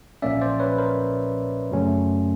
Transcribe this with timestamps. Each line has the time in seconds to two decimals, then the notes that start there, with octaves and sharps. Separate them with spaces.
0.22 B1 A#2 F3 A#3 C#4 D5 E5
0.41 C5 D5
0.59 B4 C#5
0.78 A#4 C5
1.71 F#2 C#3 F#3 A3 C#4